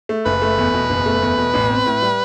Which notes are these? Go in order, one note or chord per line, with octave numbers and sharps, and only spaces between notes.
A3
F#1 B4
A3
E2
B2
F#1
A3
E2
B2
A1
C4
A2
G3